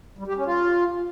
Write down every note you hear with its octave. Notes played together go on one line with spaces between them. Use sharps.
G3
G4
C#4
F4